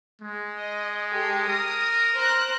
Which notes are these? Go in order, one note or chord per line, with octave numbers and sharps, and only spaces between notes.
G#3
D#5
G4 A4
A#4 D#6
C5 A#5 F#6